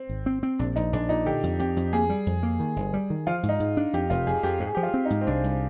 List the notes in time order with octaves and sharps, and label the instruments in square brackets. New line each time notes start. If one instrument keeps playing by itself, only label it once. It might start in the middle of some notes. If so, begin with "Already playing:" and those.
Already playing: [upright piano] C4
[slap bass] G#1
C4
C4
[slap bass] A#1 [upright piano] D4
[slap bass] A#1 [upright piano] D#4
[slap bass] A#1 [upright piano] D4
[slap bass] A#2 [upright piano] D#4
[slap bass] D3 [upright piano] G4
[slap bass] F2
[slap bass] F2 [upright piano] G4
[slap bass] F2
[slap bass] A#3 [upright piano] G#4
[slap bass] G3
F2
A#3
D#3
G1
G3
D#3
[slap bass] F3 [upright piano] F4
[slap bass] G#2
[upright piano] D#4
[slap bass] G#2
D4
[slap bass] F2 [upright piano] G4
[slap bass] F1 [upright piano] F4
[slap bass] F2 [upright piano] G#4
[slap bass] F2 [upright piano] G4
[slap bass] G#2 [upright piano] G4
[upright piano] G#4
[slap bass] F3 [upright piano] G4
[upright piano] F4
[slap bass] C4
[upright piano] D#4
[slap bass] G#2
[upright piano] C4
[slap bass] C2 [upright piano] D4
[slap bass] C2